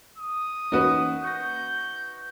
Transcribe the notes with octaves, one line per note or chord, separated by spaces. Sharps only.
D#6
E3 A#3 C#4 D#4 F#4 B4
C#6 G6 A#6